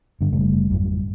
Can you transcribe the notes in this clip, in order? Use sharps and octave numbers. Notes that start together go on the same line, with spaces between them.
G2 D3
F#1 C#3 G3 A3
G#1 F2 F#3 G3